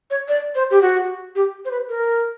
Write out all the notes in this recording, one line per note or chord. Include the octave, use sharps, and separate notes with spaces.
C#5
D5
C5
G4
F#4
G4
C5
B4
A#4